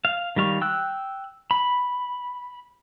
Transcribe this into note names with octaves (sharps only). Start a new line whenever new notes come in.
F5
D#3 G3 F5 C#6
G5 E6 F#6
B5